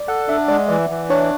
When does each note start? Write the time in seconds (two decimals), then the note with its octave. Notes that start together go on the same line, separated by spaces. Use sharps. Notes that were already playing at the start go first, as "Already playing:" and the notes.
Already playing: D5
0.08 A4 F#5
0.29 D4 E5
0.48 G#3 D5
0.69 E3 D5
0.90 E3
1.09 D4 C#5